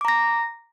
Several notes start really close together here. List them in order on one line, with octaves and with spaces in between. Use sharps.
D6 A#5 A#6